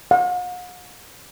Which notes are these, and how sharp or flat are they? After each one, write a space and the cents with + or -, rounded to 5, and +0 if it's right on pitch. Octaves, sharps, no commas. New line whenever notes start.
F#5 -45